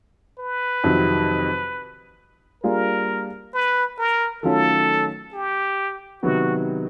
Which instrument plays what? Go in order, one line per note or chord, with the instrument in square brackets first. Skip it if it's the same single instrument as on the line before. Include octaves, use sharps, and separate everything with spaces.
[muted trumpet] B4
[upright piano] F2 C3 D#3 F#3
[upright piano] G3 A#3 D4 F4 G#4 [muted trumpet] A#4
[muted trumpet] B4
A#4
[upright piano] D#3 F#3 A3 C#4 F4 [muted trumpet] A4
[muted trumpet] G4
[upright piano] C3 D#3 F#3 B3 [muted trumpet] F#4